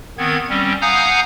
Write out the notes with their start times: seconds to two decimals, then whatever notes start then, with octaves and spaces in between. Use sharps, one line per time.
0.18 D#3 B3 C4 G#6
0.49 G3 C4 C#4
0.81 F5 F#5 G#5 A#5 D#6 G6